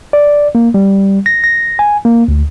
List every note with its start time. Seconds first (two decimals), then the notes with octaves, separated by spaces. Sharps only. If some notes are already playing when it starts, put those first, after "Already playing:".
0.13 D5
0.55 A#3
0.74 G3
1.26 A#6
1.44 A#6
1.79 G#5
2.05 A#3
2.28 D2